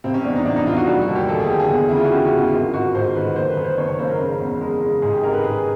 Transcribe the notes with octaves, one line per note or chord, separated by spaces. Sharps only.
F1 C4
C#4
E2 D4
D#4
E2 D4
D#4
F1 F4
F#4
G3 F#4
F#4
D#2
G4
D#2 A4
G#4
D3 G4
G#4
E2
C#3 E4
F4
F#4
C#3 G4
F#4
E2
F4
G#1 F4
G#1 F#4
G#2 C5
D#3 B4
F#1 C5
B4
D#3
C5
F#1 C#5
C#5
F#1 C5
A#4
C#3
E2
G#3
C#3
G#2 G#4
G4
G#1 A#4
B4
G#2 G#4